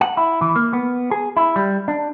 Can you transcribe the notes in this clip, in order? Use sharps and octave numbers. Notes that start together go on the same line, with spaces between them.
F#5
E4
E3
A#3
B3
G#4
E4
G3
D4